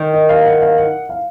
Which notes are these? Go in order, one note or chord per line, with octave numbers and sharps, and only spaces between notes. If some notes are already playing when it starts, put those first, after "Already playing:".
Already playing: D#3
D#5
F5
F#5
F5
F#5
F5